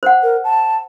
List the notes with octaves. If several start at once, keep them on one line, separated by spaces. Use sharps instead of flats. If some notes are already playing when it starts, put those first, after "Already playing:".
C5 F#5
A#4
A5